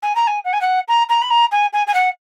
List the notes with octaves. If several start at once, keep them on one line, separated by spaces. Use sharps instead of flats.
G#5
A#5
G#5
F#5
G#5
F#5
A#5
A#5
B5
A#5
G#5
G#5
G#5
F#5